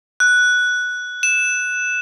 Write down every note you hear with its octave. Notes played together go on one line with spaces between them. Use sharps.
F#6
E7